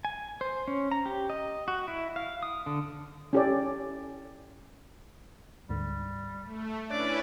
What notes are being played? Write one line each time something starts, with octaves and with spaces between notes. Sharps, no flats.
G#5
C5
C#4
A#5
G4
D#5
F#4
E4
F5
D#6
D3
C#4 E4 G4 A4 C#5 D5
D2 G#2 D3 G3
A3
C#4 D4 E4 B4 C#5 D5 F#6